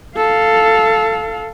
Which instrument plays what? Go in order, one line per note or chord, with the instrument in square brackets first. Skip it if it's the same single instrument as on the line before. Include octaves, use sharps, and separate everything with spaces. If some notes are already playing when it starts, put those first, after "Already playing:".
[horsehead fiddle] A4 F5